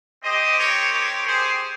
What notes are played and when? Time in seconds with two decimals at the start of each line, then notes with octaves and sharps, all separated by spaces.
0.24 C4 G4 C5 D#5
0.59 A#4 C#5
0.93 A#4 C#5
1.27 G#4 C5